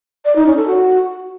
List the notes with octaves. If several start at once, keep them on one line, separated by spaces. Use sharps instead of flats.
D5
D#4
C#4
A4
F#4